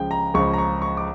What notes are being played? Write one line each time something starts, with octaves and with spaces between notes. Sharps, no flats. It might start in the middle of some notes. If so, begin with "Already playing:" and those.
Already playing: C#2 C#3 F3 G5
A#5
C#2 C#3 F3 C#6
A#5
C#6
C#6
D6